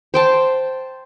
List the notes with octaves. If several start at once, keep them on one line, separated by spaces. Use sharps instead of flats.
C5 G5 A5